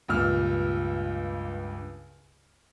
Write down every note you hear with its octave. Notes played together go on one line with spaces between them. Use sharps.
C#2 G2 A#2 E6 F6